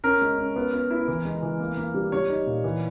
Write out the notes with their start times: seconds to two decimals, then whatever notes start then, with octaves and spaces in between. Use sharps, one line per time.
0.04 C#4 A#4
0.21 G#3
0.38 C#4
0.56 B3
0.73 B3
0.91 E4
1.08 E3
1.25 G#3
1.43 E3
1.60 A#3
1.77 A#3
1.94 G3
2.12 G3 C#5
2.29 D#4
2.46 A#2
2.64 E3